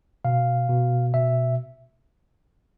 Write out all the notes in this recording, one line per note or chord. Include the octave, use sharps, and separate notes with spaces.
B2 F5
B2
B2 E5